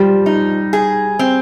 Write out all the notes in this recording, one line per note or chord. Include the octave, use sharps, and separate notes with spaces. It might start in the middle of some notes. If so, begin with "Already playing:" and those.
Already playing: F3 G3
D#4
G#4
C4